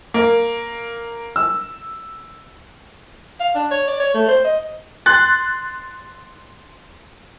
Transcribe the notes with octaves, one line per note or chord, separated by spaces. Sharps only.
A#3
E6
F5
D4
C#5
D5
C#5
A3
C5
D#5
C6 F#6 A6